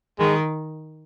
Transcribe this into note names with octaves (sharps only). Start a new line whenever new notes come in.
D#3 G#3